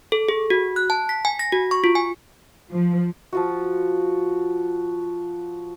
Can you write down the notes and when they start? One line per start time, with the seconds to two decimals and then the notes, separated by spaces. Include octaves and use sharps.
0.12 A4
0.29 G#4
0.50 F#4
0.76 F#6
0.90 A5
1.09 B6
1.25 G#5
1.39 A#6
1.52 F#4
1.71 C#6
1.84 F4
1.95 G#5
2.71 F3
3.33 F3 F4 F#4